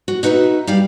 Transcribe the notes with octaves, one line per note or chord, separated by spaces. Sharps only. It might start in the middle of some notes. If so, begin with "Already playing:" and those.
F#4
D#4 F#4 B4 C#5 E5
G3 G4 F5